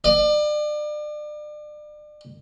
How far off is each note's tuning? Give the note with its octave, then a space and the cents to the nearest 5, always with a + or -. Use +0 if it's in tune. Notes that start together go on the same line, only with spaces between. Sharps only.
D5 +35